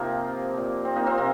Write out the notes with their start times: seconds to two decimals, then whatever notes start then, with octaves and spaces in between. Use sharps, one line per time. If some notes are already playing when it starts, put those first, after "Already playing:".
Already playing: C3 F3 A#3 C4 D#4 F4
0.53 A#2 F3
0.85 C4
0.96 A#3 D#4
1.06 C4 F4
1.18 C3 C4 F4